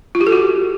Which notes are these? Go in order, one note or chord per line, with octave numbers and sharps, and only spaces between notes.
F4
G4
A4
F#4